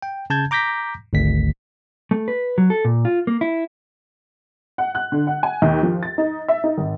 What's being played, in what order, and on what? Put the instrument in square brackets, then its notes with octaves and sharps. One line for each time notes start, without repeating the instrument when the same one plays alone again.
[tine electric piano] G5
C#3 A5 G6 G#6
A#5 D6 G6 A#6 B6
G#1 D2 B6
[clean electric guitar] A3
B4
F#3
A4
A#2
F4
A#3
E4
[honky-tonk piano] F#5
F#6
D3
F#5
G#5
D#2
F3
A6
D#4
E5
D#4
G#1